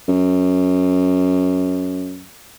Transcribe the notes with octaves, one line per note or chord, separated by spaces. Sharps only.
F#2